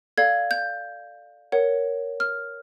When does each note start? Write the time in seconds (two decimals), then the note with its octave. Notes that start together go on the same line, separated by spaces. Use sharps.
0.18 A4 D5 F5 G#6
0.51 G6
1.52 A#4 C#5 F#5
2.20 F6